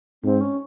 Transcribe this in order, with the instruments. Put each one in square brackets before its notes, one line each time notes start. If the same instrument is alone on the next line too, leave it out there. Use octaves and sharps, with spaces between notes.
[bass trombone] G#2 [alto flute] C4
[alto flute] C#4